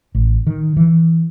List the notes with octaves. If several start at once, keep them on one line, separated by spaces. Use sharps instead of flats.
A1
D#3
E3